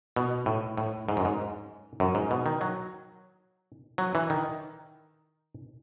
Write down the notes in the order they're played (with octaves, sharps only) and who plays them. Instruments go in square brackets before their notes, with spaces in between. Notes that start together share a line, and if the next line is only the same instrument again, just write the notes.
[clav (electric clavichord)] B2
A2
A2
G#2
F#2
G#2
F#2
G#2
B2
D#3
F#3
F#3
E3
D#3